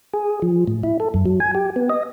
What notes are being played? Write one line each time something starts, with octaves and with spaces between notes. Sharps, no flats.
G#4
F3
A2
E4
A4
F#2
F#3
G#5
G4
B3
D#5